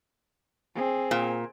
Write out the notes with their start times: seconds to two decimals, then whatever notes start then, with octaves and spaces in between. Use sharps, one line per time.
0.75 C4 G#4
1.11 A#2